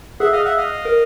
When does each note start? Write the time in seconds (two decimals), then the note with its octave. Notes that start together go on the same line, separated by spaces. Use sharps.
0.20 G#4 E5 F#5
0.32 D#5 F5
0.45 E5 F#5
0.57 D#5 F5
0.85 A#4